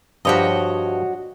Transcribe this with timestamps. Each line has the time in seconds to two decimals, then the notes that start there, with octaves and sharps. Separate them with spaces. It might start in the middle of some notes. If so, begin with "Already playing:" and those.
0.25 G2 F3 F#4 G4 C#5 D#5